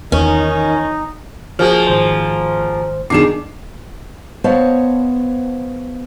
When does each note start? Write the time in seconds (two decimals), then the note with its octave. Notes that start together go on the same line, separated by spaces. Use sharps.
0.12 E2 D#3 C#4 D#4 F4
1.59 F3 A#3 F#4 G#4 F6
1.87 G#1 C5
3.10 B2 D#3 D4 D#4 G#4 D6 C7 E7
4.44 B3 C5 C#5 D#5 F5 A5